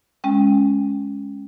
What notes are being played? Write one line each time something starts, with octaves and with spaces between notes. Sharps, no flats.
G#3 C#4 G5